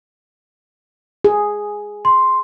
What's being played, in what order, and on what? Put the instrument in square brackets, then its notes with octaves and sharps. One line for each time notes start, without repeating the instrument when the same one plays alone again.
[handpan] G#4
[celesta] C6